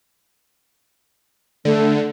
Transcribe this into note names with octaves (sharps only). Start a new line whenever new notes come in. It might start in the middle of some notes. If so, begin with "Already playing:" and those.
D3 A3